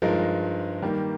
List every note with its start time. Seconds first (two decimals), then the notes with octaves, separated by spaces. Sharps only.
0.02 G2 F3 G#3 D#4 A#4
0.82 D#3 G3 A#3